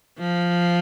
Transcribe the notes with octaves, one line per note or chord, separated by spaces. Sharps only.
F3